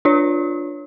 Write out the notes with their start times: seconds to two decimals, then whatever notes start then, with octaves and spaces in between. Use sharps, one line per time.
0.05 D4 F4 C#5